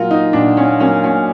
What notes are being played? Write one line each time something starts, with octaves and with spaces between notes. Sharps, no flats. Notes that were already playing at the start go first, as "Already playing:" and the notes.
Already playing: A#2 F#3 A#3 F4 F#4
D#4
A#2 D4
C#4
F#3 A#3 C#4
C#4